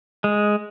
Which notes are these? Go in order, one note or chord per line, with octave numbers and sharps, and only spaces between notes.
G#3